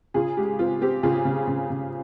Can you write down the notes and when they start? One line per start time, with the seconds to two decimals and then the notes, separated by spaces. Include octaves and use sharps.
0.14 C#3 F4 G#4
0.37 G#3 G4
0.59 C4 F4
0.81 C4 G4
1.03 C#3 F4 G#4
1.25 C#3
1.47 C#3
1.70 C#3